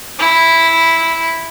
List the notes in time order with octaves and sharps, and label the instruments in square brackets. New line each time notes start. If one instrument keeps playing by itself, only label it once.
[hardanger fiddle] E4